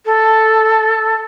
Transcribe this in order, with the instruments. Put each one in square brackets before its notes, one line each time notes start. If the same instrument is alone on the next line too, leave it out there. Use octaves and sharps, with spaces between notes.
[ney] A4